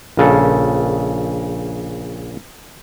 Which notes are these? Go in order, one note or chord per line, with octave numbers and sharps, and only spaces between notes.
A#1 C#3 A4